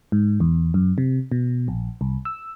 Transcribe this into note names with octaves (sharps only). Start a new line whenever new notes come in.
G#2
E2
F#2
C3
B2
A#1
C2
E6